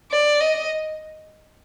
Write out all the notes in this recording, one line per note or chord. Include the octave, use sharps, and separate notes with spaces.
D5
D#5